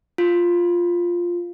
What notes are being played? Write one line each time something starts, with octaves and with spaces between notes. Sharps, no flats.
F4